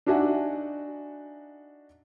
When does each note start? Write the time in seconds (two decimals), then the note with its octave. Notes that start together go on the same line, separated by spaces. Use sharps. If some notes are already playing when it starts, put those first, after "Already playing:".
0.06 D4 D#4 F#4 E5 F#5 G#5